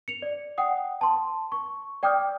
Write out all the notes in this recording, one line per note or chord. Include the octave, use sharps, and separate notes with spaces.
C#7 F7
D5
F#5 G5 D#6
A5 C6
C#6
D5 G5 D6 D#6 F6 G6